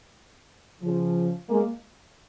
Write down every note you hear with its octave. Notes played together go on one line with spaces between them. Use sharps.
C#3 F3
G#3 A#3